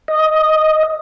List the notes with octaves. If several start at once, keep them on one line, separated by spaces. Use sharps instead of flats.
D#5